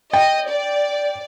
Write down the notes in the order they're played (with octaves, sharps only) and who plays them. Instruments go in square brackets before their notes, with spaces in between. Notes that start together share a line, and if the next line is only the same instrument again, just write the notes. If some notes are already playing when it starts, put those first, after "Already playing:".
[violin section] D#5 [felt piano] G5
[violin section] D5